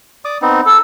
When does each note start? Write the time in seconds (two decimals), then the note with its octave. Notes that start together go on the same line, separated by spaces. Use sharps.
0.25 D5 D6 D#6
0.42 B3 C4 D#4
0.66 A4 E6